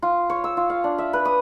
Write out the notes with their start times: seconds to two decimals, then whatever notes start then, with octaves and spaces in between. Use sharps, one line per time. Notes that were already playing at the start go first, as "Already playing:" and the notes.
0.02 F4
0.30 C#5
0.44 E6
0.57 F4
0.70 F5
0.84 D4
0.98 E5
1.13 B4
1.25 D#6